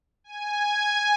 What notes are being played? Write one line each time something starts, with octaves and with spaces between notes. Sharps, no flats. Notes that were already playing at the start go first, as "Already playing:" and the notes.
G#5